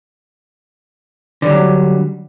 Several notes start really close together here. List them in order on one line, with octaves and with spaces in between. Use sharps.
D3 G3 F#3